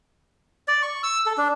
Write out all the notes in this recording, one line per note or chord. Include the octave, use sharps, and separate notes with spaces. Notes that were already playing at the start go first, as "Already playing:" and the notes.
D5
C#6
E6
A4
D4